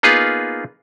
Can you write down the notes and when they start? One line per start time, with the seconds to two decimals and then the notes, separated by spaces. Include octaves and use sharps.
0.03 A#3 B3 D#4 F4 G#4 B4